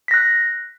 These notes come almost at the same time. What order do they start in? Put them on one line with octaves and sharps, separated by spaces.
B6 A#6 F#6